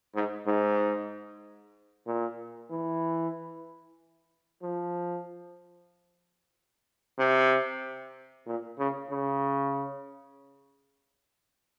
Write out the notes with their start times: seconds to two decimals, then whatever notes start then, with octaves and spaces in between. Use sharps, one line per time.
0.15 G#2
0.47 G#2
2.07 A#2
2.71 E3
4.63 F3
7.18 C3
8.46 A#2
8.79 C#3
9.10 C#3